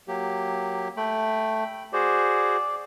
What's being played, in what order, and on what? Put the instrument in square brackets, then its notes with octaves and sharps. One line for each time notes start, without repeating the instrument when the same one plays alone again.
[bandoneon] F#3 A#3 G4
[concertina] A3 [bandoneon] G5 B5
[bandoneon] F#4 G#4 C5 [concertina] D5